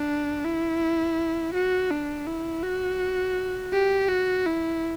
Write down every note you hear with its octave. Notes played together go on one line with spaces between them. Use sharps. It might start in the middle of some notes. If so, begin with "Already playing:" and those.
Already playing: D4
E4
F#4
D4
E4
F#4
G4
F#4
E4